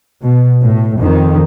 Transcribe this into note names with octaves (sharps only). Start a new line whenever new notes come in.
B2
A2
F2 D#3